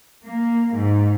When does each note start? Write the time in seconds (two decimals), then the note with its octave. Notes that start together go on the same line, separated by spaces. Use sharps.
0.24 A#3
0.74 G#2